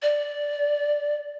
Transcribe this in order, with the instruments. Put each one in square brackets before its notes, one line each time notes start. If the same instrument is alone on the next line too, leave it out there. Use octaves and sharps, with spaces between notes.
[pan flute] D5